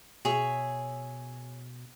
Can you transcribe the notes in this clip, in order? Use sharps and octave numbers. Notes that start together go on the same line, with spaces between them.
B2 G#4 C#5 E5